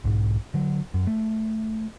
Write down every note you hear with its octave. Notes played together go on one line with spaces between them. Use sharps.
B1 G#2
D3 F#3
F#2
A3